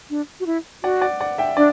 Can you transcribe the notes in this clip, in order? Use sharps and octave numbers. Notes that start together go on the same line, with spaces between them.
D4
F#4
E4
F#4 D5 F#5
D5 F#5
D5 F#5
E5 G5
D4 D5